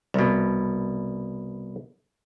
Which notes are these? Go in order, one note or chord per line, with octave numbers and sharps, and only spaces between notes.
C2 B2